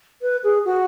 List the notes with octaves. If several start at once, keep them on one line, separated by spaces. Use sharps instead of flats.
B4
G#4
F#4